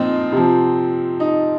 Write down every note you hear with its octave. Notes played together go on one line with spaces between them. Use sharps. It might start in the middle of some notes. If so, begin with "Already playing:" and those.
Already playing: A#2 F3 C4 D#4
C3 F3
D#4